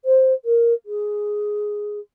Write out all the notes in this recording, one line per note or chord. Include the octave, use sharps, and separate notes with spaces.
C5
A#4
G#4